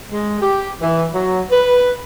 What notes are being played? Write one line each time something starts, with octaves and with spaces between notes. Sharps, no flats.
G#3
G4
E3
F#3
B4